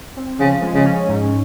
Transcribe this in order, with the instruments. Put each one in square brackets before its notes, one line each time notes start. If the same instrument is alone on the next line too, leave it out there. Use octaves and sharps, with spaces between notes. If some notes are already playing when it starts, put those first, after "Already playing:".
[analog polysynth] C4
[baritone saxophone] C#3 [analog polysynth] F3
[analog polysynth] G#3
[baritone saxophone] C#3
[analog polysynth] C#4
G#2